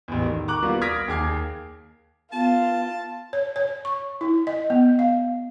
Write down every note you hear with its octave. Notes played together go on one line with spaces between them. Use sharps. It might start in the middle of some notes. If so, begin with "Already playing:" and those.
A1 E2
D#3
A#5 C#6 D6 F#6 F#7
G3 A#3 B3 F4 F#4
D#6 F6 G#6 A#6 B6 D7
D#2 G#4 D6 G#6 C7
B3 F4 A5
C#5
C#5
C#6
E4
D#5
B3
F5